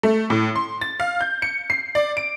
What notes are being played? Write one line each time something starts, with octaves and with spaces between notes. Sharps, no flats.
A3
A2
C6
A6
F5
G6
C#7
C7
D5
D7